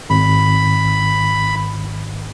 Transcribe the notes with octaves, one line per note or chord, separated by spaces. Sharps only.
G#1 B5